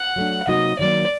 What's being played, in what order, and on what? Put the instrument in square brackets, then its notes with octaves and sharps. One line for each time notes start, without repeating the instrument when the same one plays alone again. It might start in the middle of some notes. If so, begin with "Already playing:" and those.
Already playing: [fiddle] F#5
[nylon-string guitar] F#3 A3 D4
[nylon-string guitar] C3 F#3 A#3 D#4 F#4 [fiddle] D#5
[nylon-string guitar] D#3 F#3 A#3 [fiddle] D5